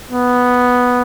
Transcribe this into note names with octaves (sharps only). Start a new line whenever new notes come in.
B3